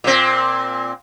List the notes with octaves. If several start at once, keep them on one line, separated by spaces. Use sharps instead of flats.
A#2 C4